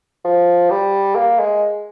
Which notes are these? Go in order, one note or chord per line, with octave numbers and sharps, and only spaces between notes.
F3
G3
A#3
G#3